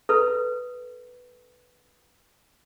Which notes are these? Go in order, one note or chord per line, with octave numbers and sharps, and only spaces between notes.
A4 B4